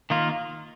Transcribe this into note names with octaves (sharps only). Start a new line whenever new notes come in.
D#3 A#3 F4